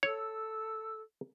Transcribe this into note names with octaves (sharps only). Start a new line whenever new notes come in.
A4 C#5 E6